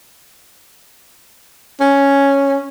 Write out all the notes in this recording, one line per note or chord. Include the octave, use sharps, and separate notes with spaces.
C#4